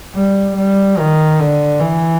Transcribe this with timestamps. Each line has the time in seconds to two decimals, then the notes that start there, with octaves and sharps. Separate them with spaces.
0.15 G3
0.56 G3
0.98 D#3
1.40 D3
1.80 E3